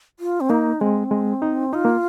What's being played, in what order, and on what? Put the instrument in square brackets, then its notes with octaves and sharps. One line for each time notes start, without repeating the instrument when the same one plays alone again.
[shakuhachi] F4
C4
[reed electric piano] A#3 [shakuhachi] D#4
[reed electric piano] G#3 [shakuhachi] C4
[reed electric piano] G#3
D#4
[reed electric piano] D#4 [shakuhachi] F4
[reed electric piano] A#3